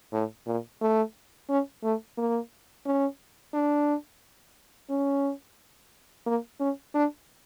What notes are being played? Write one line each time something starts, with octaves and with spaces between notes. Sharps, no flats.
A2
A#2
A3
C#4
A3
A#3
C#4
D4
C#4
A#3
C#4
D4